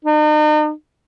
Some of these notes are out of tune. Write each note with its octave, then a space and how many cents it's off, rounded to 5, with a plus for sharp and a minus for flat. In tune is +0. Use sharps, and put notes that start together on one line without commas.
D#4 -40